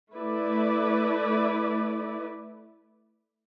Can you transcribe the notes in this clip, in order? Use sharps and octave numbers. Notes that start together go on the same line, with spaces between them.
A3 E4 B4 D5